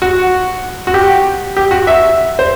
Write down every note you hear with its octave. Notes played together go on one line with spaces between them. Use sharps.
F#4
F#4
G4
G4
F#4
E5
C5